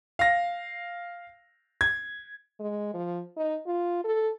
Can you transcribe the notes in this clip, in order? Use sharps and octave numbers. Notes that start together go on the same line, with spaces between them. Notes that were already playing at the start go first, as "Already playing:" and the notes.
F5 A#6
G#6
G#3
F3
D#4
F4
A4